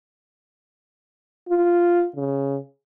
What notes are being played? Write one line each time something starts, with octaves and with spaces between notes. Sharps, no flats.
F4
C#3